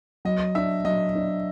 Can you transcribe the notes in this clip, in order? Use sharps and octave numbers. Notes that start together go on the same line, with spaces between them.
F#3 D#5
D4 E5
F#3 D#5
D4